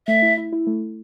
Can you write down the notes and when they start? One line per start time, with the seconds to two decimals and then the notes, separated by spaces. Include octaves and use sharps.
0.07 A3 E5
0.22 E4
0.37 E4
0.53 E4
0.67 A3